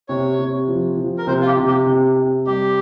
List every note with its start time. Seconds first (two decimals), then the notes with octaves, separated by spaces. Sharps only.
0.08 C3 C#5
0.39 C3
0.68 F3
0.97 F3
1.18 A#4
1.27 C3 C5
1.41 F4
1.47 G4
1.57 C3
1.67 G4
1.86 C3
2.16 C3
2.47 G3 G4